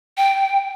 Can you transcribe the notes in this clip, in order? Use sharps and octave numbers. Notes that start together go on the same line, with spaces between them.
G5